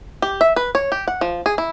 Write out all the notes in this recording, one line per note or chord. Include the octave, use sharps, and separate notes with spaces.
G4
E5
B4
C#5
G4
F#5
F3
G#4
E4